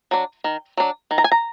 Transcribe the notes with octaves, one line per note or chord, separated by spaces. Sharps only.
F#3 D4
D#3
F#3 D4
D#3
A#5
G#5
A#5